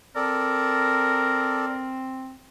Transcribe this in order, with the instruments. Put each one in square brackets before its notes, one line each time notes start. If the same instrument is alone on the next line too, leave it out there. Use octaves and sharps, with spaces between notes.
[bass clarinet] C4 [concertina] A4 D5 [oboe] A#4